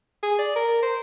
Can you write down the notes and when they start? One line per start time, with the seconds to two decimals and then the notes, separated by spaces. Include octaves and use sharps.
0.23 G#4
0.39 D5
0.56 A#4
0.83 C5